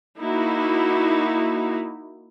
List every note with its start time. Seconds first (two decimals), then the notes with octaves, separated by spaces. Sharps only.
0.20 A#3 D#4 E4 F#4